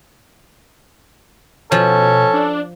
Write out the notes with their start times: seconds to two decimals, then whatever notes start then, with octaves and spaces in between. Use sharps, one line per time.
1.72 B2 F3 C#4 A4
2.34 D4